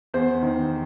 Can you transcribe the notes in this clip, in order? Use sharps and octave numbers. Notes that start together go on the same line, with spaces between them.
E2 C5
D#3